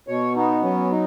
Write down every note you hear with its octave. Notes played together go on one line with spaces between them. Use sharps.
B2 C#5
B3 D#4
F#3 C#4
D#4